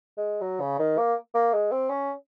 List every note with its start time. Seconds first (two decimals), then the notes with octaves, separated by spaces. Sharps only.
0.17 G#3
0.41 F#3
0.60 C#3
0.79 D#3
0.98 A#3
1.35 A#3
1.53 G#3
1.72 C4
1.89 C#4